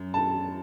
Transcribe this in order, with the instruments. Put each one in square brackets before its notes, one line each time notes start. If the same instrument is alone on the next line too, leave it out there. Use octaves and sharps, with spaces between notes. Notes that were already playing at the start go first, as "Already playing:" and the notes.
Already playing: [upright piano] F#2
A5